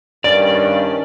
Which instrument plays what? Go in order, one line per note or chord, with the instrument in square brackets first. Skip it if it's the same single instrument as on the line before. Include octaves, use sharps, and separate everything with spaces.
[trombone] G2 [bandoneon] D#3 C#4 [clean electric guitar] D5 [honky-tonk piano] A6